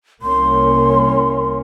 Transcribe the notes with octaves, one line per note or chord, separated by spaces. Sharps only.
C2 A#3 C#4 C6